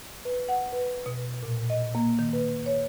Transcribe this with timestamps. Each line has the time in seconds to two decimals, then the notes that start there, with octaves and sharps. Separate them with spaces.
0.25 B4
0.49 F#5
0.73 B4
1.06 B2
1.43 A#2
1.70 D#5
1.95 A#3
2.19 D#3
2.33 B4
2.66 C#5